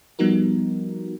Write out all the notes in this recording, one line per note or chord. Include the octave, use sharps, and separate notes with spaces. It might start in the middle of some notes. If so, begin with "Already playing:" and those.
F3 G3 B3 D#4 F#4 A#4